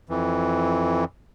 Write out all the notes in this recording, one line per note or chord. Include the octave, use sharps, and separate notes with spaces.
F2 E3